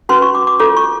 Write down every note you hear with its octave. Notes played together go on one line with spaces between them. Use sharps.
C#4 F#4 B4 C6
C#6
D6
D6
F4 A4 C#5 D6
C#6